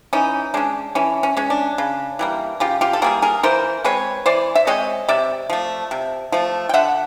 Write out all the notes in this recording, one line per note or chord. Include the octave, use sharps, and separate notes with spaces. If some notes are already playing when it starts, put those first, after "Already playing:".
E3 C#4 D#4
G#3 C#4 D4
E3 C#4
C#4
G#3 C#4
D4
C#3
E3 G3 A#3
C#3 F4 G4
F4 G4
A4
E3 G3 A#3 F#4 G#4
G#4 A#4
E3 A#4 C5
G#3 C4 B4 C#5
E3 C5 D5
E5
G#3 C4 C#5 D#5
C3 D5 E5
F3 A3
C3
F3 A3
G5
D3 E5 F#5